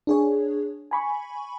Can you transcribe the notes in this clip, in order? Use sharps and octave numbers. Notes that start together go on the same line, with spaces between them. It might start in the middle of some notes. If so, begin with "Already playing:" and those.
D4 G#4 C#5
G#5 B5 C#6